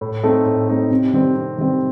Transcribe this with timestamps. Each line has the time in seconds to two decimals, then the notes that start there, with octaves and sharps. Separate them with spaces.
0.01 A2
0.23 A3 C4 D#4 A4
0.46 A2
0.68 A3 C4 D#4 A4
0.91 C3
1.13 D#3 G3 C4
1.35 C3
1.58 D#3 G3 C4